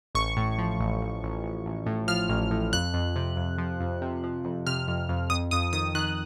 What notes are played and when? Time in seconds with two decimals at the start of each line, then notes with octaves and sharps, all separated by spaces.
0.15 A1 C#6
0.37 A2
0.58 F3
0.80 A1
1.01 A1
1.23 A1
1.43 A1
1.66 A1
1.86 A2
2.08 F3 F6
2.29 A1
2.51 A2
2.73 F2 F#6
2.94 F2
3.16 C3
3.37 F2
3.58 F3
3.80 F2
4.02 C3
4.24 F3
4.45 F2
4.67 C3 F6
4.88 F2
5.09 F2
5.30 F2 D#6
5.51 F2 D#6
5.73 D#3 D#6
5.95 D#3 F#6